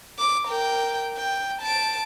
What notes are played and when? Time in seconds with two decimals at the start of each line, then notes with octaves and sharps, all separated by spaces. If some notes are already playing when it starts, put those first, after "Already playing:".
0.19 D6
0.47 A#4 G5
1.17 G5
1.62 A5 D7